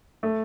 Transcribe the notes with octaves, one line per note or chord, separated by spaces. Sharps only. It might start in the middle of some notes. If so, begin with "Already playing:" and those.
A3